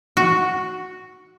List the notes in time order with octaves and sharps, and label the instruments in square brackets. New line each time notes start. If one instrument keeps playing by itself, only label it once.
[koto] F#4